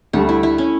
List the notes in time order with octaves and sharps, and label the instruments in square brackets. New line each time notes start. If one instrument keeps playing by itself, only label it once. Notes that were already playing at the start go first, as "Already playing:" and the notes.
[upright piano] D2 D3 G3 [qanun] A3
[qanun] E4
E4
C#4